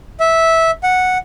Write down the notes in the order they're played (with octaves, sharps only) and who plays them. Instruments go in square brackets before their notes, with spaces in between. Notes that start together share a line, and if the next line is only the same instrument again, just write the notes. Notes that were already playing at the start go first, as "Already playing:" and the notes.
[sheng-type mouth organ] E5
F#5